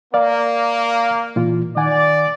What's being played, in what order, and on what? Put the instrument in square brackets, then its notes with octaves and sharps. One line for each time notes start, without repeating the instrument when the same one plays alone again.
[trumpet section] A#3 [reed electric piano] D5 F5
[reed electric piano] A#2 E3 F4
[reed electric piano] D#3 F#5 G#5 [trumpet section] D5